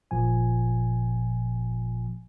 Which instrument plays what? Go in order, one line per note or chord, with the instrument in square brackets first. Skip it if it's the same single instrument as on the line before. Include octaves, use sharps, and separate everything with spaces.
[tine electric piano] G1 A#2 F3 G#5